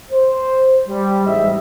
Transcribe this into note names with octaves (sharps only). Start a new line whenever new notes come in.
C5
G3
A1 G#2 D#5 E5